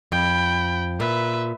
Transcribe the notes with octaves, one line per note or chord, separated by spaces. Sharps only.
F2 G5 B5
A#2 B4 E5